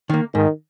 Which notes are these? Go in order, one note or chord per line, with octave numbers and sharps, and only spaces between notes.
D#3 A#3
G#2 D#3